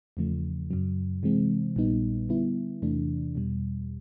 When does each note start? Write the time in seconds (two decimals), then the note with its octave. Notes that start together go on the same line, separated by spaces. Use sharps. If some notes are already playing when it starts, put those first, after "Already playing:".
0.17 E2 C#3 F3 A3
0.71 F#2 C#3 F#3
1.23 C3 E3 G#3 C4
1.76 A#1 A#2 G3 B3 D#4
2.29 D3 G3 B3 E4
2.82 E2 C3 E3 A3 D4
3.35 E2 B2 G3